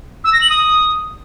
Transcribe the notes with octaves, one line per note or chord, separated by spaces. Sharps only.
E6
A#6
F#7
D#6